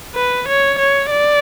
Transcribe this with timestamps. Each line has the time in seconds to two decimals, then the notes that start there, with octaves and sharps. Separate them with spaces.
0.15 B4
0.48 C#5
0.79 C#5
1.11 D5